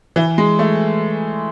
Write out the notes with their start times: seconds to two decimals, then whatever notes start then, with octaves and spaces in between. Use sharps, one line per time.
0.16 E3
0.38 G#3
0.59 A3